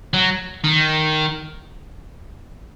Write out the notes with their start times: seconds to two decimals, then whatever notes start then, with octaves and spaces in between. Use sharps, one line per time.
0.14 F#3
0.64 D#3